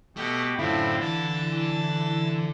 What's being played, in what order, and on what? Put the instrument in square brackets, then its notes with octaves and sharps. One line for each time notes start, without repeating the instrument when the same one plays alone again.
[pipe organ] B2 G4 [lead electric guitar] A3
[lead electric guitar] F#2 [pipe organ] A2 C4 [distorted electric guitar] D3 [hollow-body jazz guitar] E4 F4
[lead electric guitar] E3 [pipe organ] A5